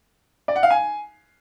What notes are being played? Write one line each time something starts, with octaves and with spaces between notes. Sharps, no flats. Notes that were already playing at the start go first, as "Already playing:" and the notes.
D5
F#5
F5
G#5